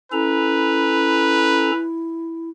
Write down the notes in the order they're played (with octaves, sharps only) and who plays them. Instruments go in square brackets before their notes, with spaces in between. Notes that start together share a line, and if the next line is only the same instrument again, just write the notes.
[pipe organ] C#4 A4 A#5 [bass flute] E4 [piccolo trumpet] B4